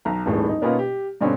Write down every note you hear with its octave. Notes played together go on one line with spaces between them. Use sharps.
B1 A#5
D#1 G#1 A2 E3 G#3 D#4
D#4
B2 A#3 B3 C#4 D#4 F4
G4
G2 B2 D3 C4 C#4